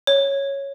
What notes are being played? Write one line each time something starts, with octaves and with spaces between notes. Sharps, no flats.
C#5